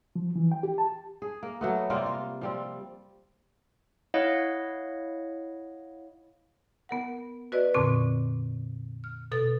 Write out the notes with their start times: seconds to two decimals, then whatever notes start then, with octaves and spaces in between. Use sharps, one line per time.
0.16 F3
0.36 E3
0.52 G5
0.63 G4
0.78 A5
1.22 G#4
1.43 A#3
1.61 F#3 A3 B3
1.90 C3 G3 A#3 F4
2.06 F4
2.41 F3 G3 C4
4.14 E4 C#5 D#5 F5 F#5
6.89 B3 A#4 F#5
7.52 F#4 B4 D5 D#5
7.74 F2 A#2 D3 C4 C#6
9.04 F6
9.32 B2 A4 A6